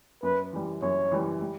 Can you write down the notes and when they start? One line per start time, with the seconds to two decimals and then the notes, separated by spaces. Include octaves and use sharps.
0.23 F#2 B4
0.53 E3 G3
0.82 F#2 C#5
1.12 E3 G3
1.41 G3